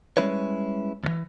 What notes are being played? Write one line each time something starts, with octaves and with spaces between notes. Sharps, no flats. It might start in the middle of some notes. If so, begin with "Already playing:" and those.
G3 G#3 C#4 E4 B4 C#5
D#2 E3